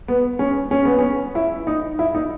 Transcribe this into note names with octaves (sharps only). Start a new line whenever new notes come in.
B3
C#4
C#4
B3
C#4
E4
D#4
E4
D#4